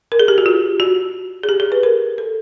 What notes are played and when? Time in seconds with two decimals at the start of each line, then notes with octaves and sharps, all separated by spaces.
0.12 A#4
0.20 G#4
0.28 G4
0.38 F#4
0.46 F4
0.80 F#4
1.43 G#4
1.49 G4
1.60 G#4
1.72 B4
1.83 A#4
2.18 A4